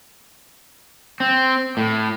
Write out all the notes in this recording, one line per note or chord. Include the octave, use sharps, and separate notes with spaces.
C4
A2